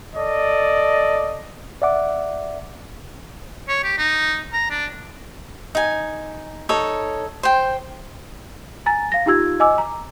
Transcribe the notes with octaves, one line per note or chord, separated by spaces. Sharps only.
A4 D5 D#5
D5 E5 F#5 D6
C#5
G4
D#4
A#5
D4
D#4 G#5
D#4 A4 C#5
C5 G5
G#5 A#5 A6
F5 A#6
D#4 F4 G4 E6 G#6
D#5 G#5 D6 E6
A#5